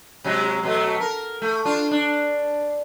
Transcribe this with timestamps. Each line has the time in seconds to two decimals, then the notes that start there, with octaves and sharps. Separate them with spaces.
0.24 C3 F#3 G#3
0.63 B2 F#3 A3
1.00 A#4
1.42 A3
1.65 D4 F4
1.91 D4